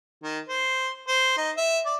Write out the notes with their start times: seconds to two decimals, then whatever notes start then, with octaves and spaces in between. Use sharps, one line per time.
0.23 D#3
0.49 C5
1.08 C5
1.38 D#4
1.57 E5
1.86 D5